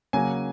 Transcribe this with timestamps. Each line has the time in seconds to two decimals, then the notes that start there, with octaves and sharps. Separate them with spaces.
0.13 C#3 F#3 A#3 G#5